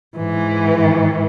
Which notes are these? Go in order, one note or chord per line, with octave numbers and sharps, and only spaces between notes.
G#2 E3